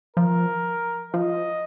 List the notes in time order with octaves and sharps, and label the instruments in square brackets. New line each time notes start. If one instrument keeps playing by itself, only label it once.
[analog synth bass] F3 [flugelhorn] A#4
[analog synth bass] F3 [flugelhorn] D#5